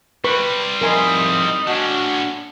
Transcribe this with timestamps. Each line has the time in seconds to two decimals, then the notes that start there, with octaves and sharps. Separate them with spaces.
0.24 G3 C4 B4 B5 C#6
0.81 F2 D#4 E4 A#4 G#5 C6
1.67 A2 C#4 D4 F#4 A5